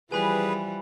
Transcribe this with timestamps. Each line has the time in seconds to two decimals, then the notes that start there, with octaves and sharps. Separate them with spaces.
0.12 E3 F3 G3 G#4 B4 G#5 B5 F#6